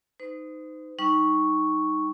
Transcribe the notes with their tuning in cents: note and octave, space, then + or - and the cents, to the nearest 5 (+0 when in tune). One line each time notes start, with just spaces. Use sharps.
D#4 +0 C5 -40
G3 +5 D#4 +5 C#6 +0